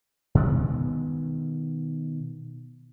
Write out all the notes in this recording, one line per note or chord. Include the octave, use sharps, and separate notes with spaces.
B2 D#3 G#3 B3